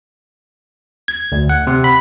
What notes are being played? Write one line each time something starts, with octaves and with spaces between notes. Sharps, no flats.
G#6
D2
F#5
C3
B5